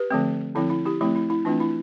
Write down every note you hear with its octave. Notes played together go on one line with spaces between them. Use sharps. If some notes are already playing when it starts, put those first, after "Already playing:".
Already playing: G4 B4
D3 F3 A3 C4
D3 F3 C4 E4
E4
E4 G4
F3 A3 C4 E4
E4
E4
E3 A3 C4 D4 F4
E4